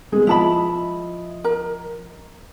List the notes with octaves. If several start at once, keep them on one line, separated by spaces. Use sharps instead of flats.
G#3 B3
F3 E4 D#5 A5 B5
A#4